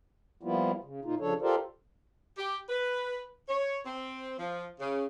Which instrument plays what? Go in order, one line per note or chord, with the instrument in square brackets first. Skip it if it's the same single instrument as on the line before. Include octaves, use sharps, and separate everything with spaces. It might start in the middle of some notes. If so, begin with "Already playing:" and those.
[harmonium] F3 G3 A#3 B3 E4 F4
C#3
A#2 A#3 D#4 F4
C#3 F3 D4 A4 C#5
F4 G4 A4 A#4 C5 D5
[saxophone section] G4
B4
C#5
C4
F3
C#3